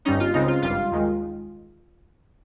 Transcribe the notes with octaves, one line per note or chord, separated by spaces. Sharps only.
G1 G2 G3 C#4 D#4
F4
C#2 C#3 G#3 C4 D#4
F4
G#1 G2 G3 F4
D#2 D#3 G#3